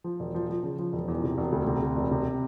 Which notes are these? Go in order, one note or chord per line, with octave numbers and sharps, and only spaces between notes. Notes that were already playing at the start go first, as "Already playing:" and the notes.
F3
E1
F3
F3
C#3
F3
E1
E2
C3
E1
D2
C3
D2
E1
C3